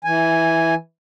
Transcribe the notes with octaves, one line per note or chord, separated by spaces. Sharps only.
E3 G#5